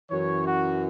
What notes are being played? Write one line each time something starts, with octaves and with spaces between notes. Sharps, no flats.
F#2 E3 C#5
F#4